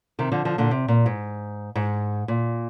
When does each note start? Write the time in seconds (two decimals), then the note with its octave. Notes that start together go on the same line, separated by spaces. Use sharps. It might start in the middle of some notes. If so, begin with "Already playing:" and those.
0.19 C3 D#3
0.32 D3 F3
0.45 D3 F3
0.58 A#2 D3
0.71 C3
0.88 A#2
1.06 G#2
1.75 G#2
2.28 A#2